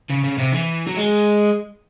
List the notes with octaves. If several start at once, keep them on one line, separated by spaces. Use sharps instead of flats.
C#3
C#3
C3
E3
F#3
G#3